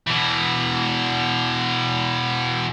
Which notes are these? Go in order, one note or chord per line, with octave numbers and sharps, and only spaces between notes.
B2 E3